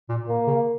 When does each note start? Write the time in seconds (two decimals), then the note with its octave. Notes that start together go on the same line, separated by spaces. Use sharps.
0.09 A#2
0.28 A#2 A#3
0.47 C#3